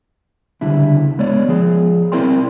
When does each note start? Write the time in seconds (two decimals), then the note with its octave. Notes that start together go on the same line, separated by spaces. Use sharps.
0.61 C#2 D3 G3 E4
1.19 G#3 B3 C#5 D5
1.49 F3 G#4
2.12 C4 E4 A#4 D5 G5 C6